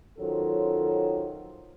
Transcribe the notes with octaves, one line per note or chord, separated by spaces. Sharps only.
D#3 F#3 C#4 F4 A4 C5